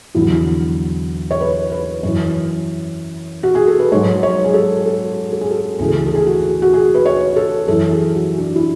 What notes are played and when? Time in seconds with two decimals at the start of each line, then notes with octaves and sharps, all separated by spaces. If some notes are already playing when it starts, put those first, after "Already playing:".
0.15 E2 D3 F#3 E4
1.31 C#5
1.41 B4
1.72 B4
2.03 F#2 E3 C#5
3.43 F#4
3.55 G#4
3.68 A4
3.79 B4
3.92 G#2 F#3 C#5
4.23 C#5
4.44 G#4
4.54 A4
4.86 A4
5.32 A4
5.41 G#4
5.51 A4
5.79 D2 C#3 E3 G#4
5.88 A4
5.97 G#4
6.06 A4
6.15 G#4
6.27 F#4
6.62 F#4
6.74 G#4
6.95 B4
7.06 C#5
7.36 A4
7.68 F#2 E3 A4
7.91 G#4
8.15 F#4
8.38 D4
8.56 E4